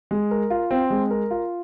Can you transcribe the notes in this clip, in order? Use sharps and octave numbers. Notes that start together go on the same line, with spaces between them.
G#3
A#4
F4
C4
G#3
A#4
F4